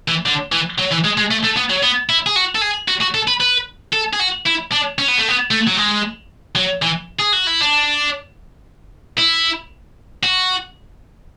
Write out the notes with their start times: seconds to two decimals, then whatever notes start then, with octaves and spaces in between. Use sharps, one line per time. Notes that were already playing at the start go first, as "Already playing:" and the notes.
0.08 E3
0.26 D3
0.52 E3
0.78 F#3
0.91 E3
1.04 G#3
1.17 G#3
1.31 A3
1.44 A3
1.57 B3
1.70 F#3
1.83 B3
2.09 E4
2.26 G#4
2.36 F#4
2.55 A4
2.62 G#4
2.88 F#4
3.01 F#4
3.14 A4
3.28 B4
3.41 B4
3.93 A4
4.13 G#4
4.19 F#4
4.46 E4
4.72 D4
4.98 C#4
5.08 B3
5.19 A3
5.29 B3
5.51 A3
5.67 F#3
5.77 G#3
6.56 F#3
6.82 E3
7.19 G#4
7.33 F#4
7.47 E4
7.61 D4
9.18 E4
10.23 F#4